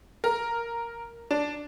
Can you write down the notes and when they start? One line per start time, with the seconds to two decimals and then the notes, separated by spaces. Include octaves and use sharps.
0.24 A#4
1.31 D4